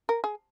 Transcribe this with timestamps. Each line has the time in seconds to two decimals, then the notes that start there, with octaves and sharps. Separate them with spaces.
0.09 A#4
0.24 G#4